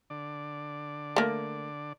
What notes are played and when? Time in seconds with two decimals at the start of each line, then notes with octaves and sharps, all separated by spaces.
0.10 D3 D5
1.16 A3 A#3